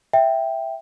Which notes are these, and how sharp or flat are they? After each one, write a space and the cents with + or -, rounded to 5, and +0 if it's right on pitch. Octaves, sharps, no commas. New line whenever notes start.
E5 +0 G5 +0